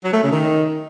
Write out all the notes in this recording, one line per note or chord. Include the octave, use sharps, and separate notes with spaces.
F#3
A3
C#3
D#3